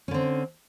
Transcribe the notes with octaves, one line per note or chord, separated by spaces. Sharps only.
D3 C4 C#4